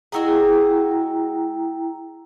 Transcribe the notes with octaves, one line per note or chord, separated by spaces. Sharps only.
G#3 E4 F#4 G#4 G5 A#5